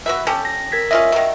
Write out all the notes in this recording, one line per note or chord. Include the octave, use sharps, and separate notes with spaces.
F#4 B4 E5
C#4 G4 A4
A#6
A#4 G#6 B6
C#4 F4 D#5 E5
D#3 F#3